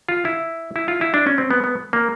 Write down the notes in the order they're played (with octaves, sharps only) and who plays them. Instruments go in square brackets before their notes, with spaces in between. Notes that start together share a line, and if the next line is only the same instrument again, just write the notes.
[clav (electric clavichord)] F4
E4
E4
F4
E4
D4
C#4
C4
B3
B3
A#3